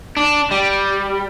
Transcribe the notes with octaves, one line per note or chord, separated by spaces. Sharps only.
D4
G3